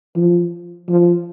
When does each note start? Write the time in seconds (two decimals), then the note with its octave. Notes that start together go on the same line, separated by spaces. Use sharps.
0.16 F3
0.89 F3